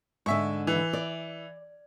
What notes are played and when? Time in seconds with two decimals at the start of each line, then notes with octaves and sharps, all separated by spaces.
0.26 G#2 D3 E5 C#6
0.67 E3
0.93 D5